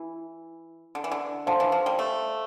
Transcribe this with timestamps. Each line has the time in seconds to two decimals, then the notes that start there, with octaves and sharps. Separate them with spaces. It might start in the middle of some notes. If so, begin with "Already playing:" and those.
Already playing: E3 E4
0.95 D3
1.04 E3
1.12 D3
1.47 D3 C5 F5 A5 C6
1.60 E3
1.72 F3
1.86 G3
1.99 A3